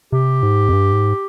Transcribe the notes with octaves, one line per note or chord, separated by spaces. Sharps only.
C3 G4
G#2
F2
G2
G#2